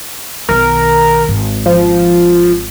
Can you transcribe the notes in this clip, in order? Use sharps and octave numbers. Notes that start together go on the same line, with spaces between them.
B1 D#3 A#4
G#1
F3